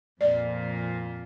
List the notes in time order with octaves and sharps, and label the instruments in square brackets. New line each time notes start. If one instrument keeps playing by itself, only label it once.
[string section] F2 A#2 [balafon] D5